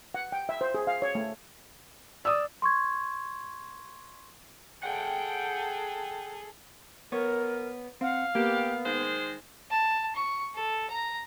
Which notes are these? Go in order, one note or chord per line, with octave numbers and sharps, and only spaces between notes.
F#5
G5
E5
C5
G#4
F5
C#5
A3
D5 D#6 E6
C6 C#6 G#6
G#4 A4 F#5 G5
B3 A#4 C#5
C4 F5 F#5
A#3 B3 G4
D#3 G#3 C5
A5
C#6
A4
A#5